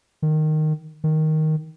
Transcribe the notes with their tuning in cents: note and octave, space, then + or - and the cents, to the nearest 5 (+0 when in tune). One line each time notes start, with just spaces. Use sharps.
D#3 -10
D#3 +5